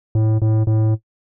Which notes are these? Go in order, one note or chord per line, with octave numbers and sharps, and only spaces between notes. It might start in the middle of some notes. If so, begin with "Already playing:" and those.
A2
A2
A2